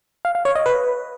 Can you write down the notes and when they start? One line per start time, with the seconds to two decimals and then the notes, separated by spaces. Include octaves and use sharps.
0.25 F5
0.35 F5
0.45 C#5
0.55 D#5
0.66 B4